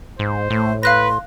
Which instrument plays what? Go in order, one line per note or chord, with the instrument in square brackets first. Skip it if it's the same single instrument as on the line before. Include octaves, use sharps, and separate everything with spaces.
[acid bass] G#2 [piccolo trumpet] C5
[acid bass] A2 [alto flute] A3
[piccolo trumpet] B4 [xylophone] F5 F#6 A#6 [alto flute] C6